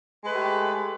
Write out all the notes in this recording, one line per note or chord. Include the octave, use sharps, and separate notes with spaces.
G#3 A3 G4 B4